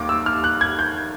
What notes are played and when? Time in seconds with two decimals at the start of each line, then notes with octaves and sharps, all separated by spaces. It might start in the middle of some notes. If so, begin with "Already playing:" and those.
Already playing: D#2 D#3 D6
0.09 E6
0.26 F6
0.44 F#6
0.61 G#6
0.79 G6